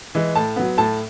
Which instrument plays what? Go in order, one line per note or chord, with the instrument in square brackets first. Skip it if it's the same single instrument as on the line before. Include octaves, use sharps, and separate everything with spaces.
[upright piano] E3 G#3
A2 A5
F#3 B3
A2 A5